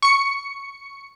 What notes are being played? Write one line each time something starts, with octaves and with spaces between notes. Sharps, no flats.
C#6 C#7